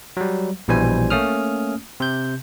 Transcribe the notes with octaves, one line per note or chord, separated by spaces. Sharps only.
F#3 G3
A#1 B2 E3 G3 C5 G#5
A3 A#3 C#4 D#6 F6
C3 G6